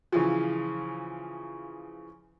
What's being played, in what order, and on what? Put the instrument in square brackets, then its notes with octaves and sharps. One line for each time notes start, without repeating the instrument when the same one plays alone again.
[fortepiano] C#3 E3 F3